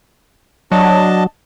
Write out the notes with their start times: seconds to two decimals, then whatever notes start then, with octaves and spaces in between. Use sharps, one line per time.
0.72 F#3 D4 D#5 A5